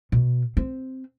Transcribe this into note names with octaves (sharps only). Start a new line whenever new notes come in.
B2
C4